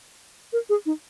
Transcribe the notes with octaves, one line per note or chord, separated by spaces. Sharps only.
A#4
G#4
D#4